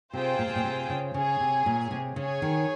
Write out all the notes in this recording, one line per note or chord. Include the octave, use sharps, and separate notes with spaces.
C3 F4 G#4 C5 G5
A#2
C3
A#2
C3
C#3
C#3 G#4 C#5 G#5
C3
A#2
C3
C#3 G#4 C#5 G#5
D#3